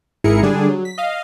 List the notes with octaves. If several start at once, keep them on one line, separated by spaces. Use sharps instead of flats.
G#1 G#2 E4 G#4 A#4 C#7
D3 G3 D4 G#4
F#3
B6
D#5 F5